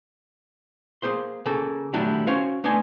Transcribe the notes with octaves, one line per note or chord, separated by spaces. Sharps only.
A#3 G#4 C5 C6
C#3 A#3 A4
D#3 F#3 G3 A3 D4 E4
C#4 F#4 C5 C#5 F5
A3 B3 D4 D#4 G#5 C6